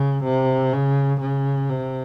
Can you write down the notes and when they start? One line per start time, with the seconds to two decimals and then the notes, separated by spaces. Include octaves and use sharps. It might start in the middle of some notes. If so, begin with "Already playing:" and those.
Already playing: C#3
0.25 C3
0.73 C#3
1.21 C#3
1.70 C3